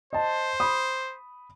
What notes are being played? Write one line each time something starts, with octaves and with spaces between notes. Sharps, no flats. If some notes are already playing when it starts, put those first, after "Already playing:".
C5 D#5 A5
B5 D#6